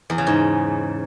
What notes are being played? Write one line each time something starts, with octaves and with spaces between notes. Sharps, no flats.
E2
C#3
G#2